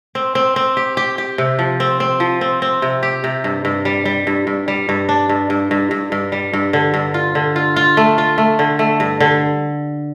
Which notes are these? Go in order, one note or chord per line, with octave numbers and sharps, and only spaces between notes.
C4
C4
C4
G4
G4
G4
C3
F3
C4
C4
F3
C4
C4
C3
G4
C3
G2
G2
G3
G3
G2
G2
G3
G2
D4
G2
G2
G2
G2
G2
G3
G2
D3
G2
F4
D3
F4
F4
A3
F4
A3
D3
A3
G2
D3